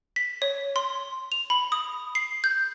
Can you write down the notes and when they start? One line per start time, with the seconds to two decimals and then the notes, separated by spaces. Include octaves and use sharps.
0.16 B6
0.42 C#5
0.76 C6
1.32 F7
1.50 B5
1.72 D#6
2.15 C7
2.44 G6